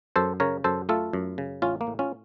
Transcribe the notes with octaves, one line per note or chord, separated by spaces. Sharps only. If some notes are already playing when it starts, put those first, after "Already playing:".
F#2 A4 C5
C#3 A#4 C#5
F#2 A4 C5
A3 F4 A4
F#2
C#3
A1 C#4 F4
A#3
A2
C#4 F4